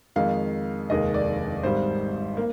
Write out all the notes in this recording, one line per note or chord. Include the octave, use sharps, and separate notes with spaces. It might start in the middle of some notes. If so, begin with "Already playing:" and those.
F2 D#3 G#3 F5
F1 D#2 D#3 G#3 D#5
D5
G#1 G#2 G3 C5
A#3